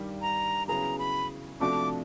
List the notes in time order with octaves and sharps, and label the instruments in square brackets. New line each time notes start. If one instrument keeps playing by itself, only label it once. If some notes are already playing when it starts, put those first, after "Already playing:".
Already playing: [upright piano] G2 D#3 G3
[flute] A#5
[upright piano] C#3 F#3 B3 E4 G#4 [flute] A#5
[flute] B5
[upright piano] C3 F3 A3 D4 F#4 [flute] D6